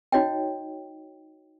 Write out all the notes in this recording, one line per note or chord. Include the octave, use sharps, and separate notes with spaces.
D#4 F#4 C#5 D#5 G5